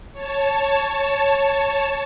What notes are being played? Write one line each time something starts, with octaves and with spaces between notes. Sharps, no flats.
C#5 A5